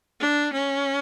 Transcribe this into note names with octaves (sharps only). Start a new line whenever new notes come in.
D4
C#4